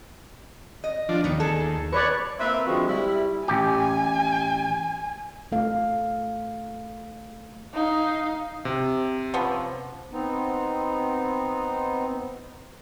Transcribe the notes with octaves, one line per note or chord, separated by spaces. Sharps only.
D#5
F3 D4
D#2 G3 B3
G#4 A4
B4 C#5 D5 C#6
A#3 C4 B4 E5
D3 F3 G#3 C4 F#4
G3 E4
A1 G4 G#5
A3 A4 F5
D#4 F5
C3
F3 B3 C#4
B3 C4 D#4